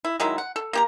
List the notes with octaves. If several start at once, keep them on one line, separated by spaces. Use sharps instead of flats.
E4
D#3 F#3 G#3 E4
F#5
A4
A#3 G4 A#5